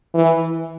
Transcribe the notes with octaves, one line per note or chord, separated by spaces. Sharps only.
E3